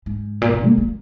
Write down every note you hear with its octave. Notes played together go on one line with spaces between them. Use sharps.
G#2
A#2
B2
A#3
A#3